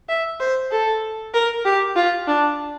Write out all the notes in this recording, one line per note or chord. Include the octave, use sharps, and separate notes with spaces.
E5
C5
A4
A#4
G4
F4
D4